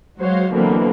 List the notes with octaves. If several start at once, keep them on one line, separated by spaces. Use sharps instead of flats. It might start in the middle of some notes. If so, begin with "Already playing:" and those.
F#3 G#3 F#4 C5 C#5 F5
B2 D3 E3 F#3 A#3 C4